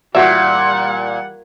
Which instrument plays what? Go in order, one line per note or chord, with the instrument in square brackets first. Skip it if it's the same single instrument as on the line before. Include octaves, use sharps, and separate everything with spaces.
[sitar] A#2 [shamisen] E3 F#4 E5 [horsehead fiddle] G3 F#5